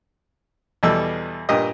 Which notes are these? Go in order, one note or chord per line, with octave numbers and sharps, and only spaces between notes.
E2 B2 G3 A4 E6
G2 A#2 G4 D#5 D#6